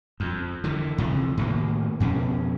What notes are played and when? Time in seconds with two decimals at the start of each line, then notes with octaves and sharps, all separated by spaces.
0.20 F2
0.64 D3 E3
0.98 C3 E3 F3
1.37 A2 D#3 A#3
2.00 F2 B2 C#4